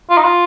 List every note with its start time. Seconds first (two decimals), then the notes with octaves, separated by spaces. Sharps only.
0.10 F4
0.17 D#4
0.24 F4